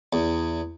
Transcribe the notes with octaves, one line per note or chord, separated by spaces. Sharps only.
E2